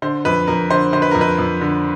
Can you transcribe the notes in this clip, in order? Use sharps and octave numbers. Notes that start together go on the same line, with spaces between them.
D3 C5
F2 B4
F2 A#4
D3 C5
D3 C5
B4
F2 A#4
B4
F2
D3